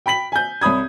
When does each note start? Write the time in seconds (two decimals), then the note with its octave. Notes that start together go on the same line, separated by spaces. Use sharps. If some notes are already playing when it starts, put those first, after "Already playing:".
0.06 G5 B5 B6 F#7
0.32 G#5 G6
0.61 C2 C#5 B5 D#6 G#6